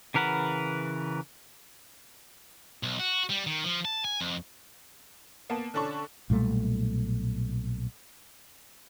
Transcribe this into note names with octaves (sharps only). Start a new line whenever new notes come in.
C#3 E3 A#4 B4 F#5
B1
F#4
G3
D#3
F3
A5
G#5
F2
A#3 B3 A5
D3 C#4 D4 A5 C#6
B1 A#2 G3 A3